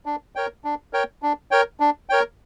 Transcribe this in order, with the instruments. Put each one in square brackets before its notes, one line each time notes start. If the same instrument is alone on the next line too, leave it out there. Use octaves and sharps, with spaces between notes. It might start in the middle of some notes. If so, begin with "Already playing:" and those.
[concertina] D4
A#4 C#5 G5
D4
A#4 C#5 G5
D4
A#4 C#5 G5
D4
A#4 C#5 G5